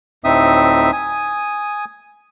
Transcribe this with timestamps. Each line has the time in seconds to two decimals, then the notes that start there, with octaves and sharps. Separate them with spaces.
0.24 D2 A2 C4 D#4 E5 D#6
0.92 G#5 D#6